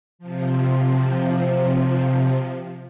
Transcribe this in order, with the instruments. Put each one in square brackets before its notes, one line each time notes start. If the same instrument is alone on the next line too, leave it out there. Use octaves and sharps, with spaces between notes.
[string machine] C3 F3